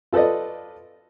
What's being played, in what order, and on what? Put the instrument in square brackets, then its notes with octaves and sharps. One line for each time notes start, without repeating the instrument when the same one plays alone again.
[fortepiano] F4 A4 B4 D5 D#5